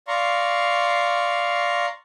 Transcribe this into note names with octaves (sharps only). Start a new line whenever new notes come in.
D5 F5 A#5 C6 C#6